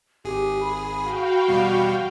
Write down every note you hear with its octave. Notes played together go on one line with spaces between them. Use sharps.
G#1 G4 G#4
B5
F#4 F5 G5
E2 B2 G3